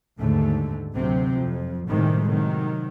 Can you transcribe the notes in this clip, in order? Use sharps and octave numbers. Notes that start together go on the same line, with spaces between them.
D#2 G#2 D3 A3
D2 C3 F#3 C4
F2
A2 C3 D#3 G3 G#3
C3 D#3 F#3